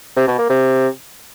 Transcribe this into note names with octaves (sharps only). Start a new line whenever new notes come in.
C3
B2
A#3
C3